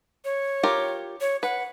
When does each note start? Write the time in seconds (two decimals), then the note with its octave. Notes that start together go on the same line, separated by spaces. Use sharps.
0.25 C#5
0.63 F4 G4 A#4
1.21 C#5
1.43 B4 F#5